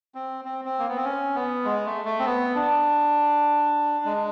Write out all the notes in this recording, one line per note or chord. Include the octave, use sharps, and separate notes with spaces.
C4
C4
C4
A#3
B3
C4
C#4
B3
G#3
A3
A3
C4
B3
D4
G#3